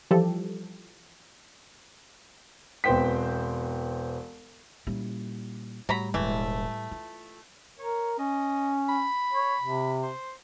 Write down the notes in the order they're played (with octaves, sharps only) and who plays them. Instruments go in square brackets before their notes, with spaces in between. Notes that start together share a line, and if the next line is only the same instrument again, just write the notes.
[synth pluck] E3 F3 G3 G4 A4
[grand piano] E1 B3 C4 C5 G5 B6
[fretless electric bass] A#2 G3 [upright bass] C#4 E4
[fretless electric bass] A2 G3 [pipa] F#3 A#5 B5
[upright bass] E1 [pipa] E3 A3
[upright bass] F4
[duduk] A#4 [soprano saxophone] C#5
[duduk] C#4 [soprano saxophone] D#5
[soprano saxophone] B5
[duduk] C#5
C3
[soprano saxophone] C5